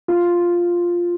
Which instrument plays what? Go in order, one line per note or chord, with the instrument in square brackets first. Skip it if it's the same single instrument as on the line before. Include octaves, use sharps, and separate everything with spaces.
[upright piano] F4